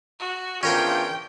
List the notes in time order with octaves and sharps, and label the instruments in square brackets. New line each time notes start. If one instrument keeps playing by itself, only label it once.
[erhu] F#4
[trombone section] E2 D4 F4 [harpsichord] C#4 A#4 C5 [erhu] G5